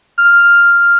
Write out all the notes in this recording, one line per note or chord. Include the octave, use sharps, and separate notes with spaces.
F6